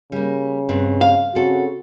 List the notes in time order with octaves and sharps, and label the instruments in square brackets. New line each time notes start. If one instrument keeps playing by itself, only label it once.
[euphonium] C#3 [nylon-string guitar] G3 A#3
[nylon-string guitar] G2 B2 C4
[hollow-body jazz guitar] F5
[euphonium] C#3 [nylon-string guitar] C4 A4 [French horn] F#4